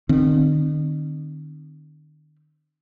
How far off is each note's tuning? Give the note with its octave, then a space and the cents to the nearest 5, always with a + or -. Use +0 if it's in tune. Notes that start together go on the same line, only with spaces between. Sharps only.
D#3 -40 C4 +0